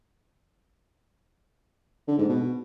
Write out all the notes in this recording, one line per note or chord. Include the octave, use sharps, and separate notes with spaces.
D3
G#2
B2